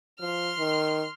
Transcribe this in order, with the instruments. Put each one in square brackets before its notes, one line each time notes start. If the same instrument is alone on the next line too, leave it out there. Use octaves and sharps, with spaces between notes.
[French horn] F3 [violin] C6 F6
[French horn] D#3